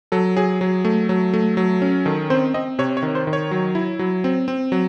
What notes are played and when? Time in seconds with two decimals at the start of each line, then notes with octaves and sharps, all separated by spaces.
0.12 F#3 A4
0.37 F#3 G#4
0.61 F#3
0.85 A3
1.09 F#3
1.34 A3
1.57 F#3
1.82 C#4
2.05 D#3 A4
2.30 C4 C5
2.54 C4 D#5
2.79 C3 C#5
2.97 C#5
3.03 D#3
3.15 C5
3.27 D#3
3.33 C#5
3.51 F#3
3.75 E4
3.99 F#3
4.24 C4
4.48 C4
4.72 F#3